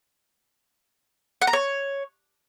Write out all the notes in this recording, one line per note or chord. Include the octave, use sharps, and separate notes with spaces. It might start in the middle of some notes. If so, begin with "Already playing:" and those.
F#5
A#5
C#5